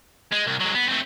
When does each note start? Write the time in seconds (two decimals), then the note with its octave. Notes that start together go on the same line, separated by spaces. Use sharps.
0.33 G#3
0.47 C2
0.61 F#3 G#3
0.75 B3
0.89 A3 C4